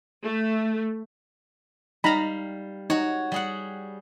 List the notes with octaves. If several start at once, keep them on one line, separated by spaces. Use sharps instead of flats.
A3
G3 D#4 F5 A#5 B5
D#4 F#4 C#5
G3 G#4 F#5